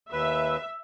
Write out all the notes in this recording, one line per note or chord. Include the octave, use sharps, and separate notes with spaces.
D#2 B4 E5